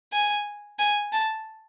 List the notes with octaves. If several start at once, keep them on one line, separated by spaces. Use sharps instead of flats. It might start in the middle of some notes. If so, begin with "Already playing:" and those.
G#5
G#5
A5